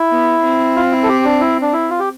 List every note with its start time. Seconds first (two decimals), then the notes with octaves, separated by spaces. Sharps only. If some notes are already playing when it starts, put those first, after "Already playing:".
Already playing: E4
0.11 B3
0.44 C4
0.76 F4
0.92 E4
1.03 A4
1.09 G4
1.25 D4
1.41 E4
1.62 D4
1.73 E4
1.90 F4
1.99 G4